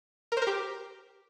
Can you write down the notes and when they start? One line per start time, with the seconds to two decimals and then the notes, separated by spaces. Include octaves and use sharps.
0.32 A#4
0.37 C5
0.42 A#4
0.47 G4